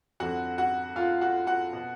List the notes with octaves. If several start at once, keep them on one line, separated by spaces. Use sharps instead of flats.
F2 D3 F#4 F#5
F#4 F#5
F4 F5
F#4 F#5
F#4 F#5
B2